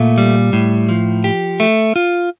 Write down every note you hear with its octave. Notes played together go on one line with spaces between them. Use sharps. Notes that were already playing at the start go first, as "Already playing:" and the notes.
Already playing: A#2 A3
G3
A2
F3
G4
A3
F4